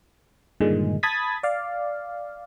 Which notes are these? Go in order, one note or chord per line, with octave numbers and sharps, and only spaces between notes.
G2 A#2 D3 D#3 G#3
A5 B5 D#6 G#6 A6 B6
D5 F5